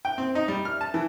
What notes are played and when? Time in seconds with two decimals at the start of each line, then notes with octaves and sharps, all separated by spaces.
0.05 G5
0.18 C4
0.35 D#4
0.48 G3
0.65 F6
0.81 A5
0.94 E3